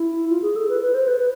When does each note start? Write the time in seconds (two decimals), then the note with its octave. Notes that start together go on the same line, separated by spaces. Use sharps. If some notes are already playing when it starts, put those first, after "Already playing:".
Already playing: E4
0.30 F4
0.42 G#4
0.56 A4
0.69 B4
0.81 B4
0.94 C5
1.08 B4
1.18 B4